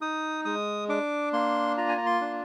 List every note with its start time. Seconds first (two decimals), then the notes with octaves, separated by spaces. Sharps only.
0.01 D#4 D#6
0.45 G#3 D#6
0.89 D4 D6
1.33 A#3 C6
1.77 F4 A#5
1.89 G#5
1.97 A#5
2.06 C6
2.21 D4